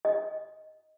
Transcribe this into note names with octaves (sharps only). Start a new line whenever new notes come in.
D#5